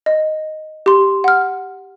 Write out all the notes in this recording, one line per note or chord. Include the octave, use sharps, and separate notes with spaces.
D#5
G4 C6
F#5 F6